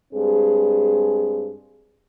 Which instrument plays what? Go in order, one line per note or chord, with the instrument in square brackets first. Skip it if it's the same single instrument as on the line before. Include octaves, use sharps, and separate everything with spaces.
[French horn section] G2 G#3 C4 G#4